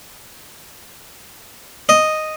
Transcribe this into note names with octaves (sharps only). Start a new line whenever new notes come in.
D#5